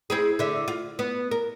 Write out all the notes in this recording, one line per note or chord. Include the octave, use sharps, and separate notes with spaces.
C4 E4 G#4
D3 E5
F4
B3
A#4